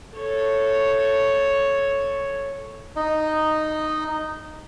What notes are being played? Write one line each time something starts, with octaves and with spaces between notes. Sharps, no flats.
A4 C#5
D#4 D#5